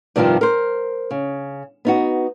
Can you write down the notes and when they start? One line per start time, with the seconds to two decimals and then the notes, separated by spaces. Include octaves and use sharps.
0.16 G2 C3 D#3 F3 F4
0.41 A#4 C5
1.11 C#3
1.85 B3 D#4 F#4